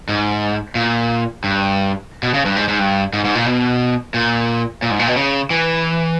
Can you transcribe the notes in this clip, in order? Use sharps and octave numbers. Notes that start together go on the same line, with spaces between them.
G#2
A#2
G2
B2
C#3
G2
G#2
G#2
G2
G#2
G#2
A#2
B2
A#2
A#2
G#2
A#2
B2
C#3
E3